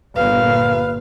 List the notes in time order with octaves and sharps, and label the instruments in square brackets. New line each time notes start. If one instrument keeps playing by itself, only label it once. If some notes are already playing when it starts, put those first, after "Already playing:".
[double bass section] G1 A#2 [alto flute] B4 [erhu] F5